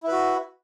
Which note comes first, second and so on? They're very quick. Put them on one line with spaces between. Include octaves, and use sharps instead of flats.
E4 B4 F#4